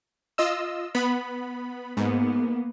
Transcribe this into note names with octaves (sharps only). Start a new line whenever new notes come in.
F4 D#5 E6
B3 B5
G#2 A#3 B3